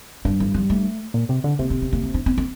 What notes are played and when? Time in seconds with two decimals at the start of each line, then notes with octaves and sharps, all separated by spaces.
0.25 G2 G3
0.40 E3
0.54 F3
0.70 A3
1.14 A#2
1.29 C3
1.44 D3
1.59 C3 A#3
1.70 C4
1.82 C4
1.93 A#3
2.04 A#3
2.14 D4
2.26 C4
2.38 C4